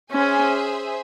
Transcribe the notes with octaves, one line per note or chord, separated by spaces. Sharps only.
C#4 G#4 C5 E5 G#5